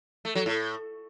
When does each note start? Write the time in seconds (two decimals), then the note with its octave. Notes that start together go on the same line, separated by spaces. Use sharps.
0.25 A3
0.35 F#3
0.46 A2